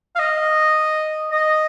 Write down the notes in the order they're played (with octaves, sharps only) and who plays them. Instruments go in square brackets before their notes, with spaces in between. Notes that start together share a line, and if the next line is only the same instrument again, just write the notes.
[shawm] F5
D#5
D#5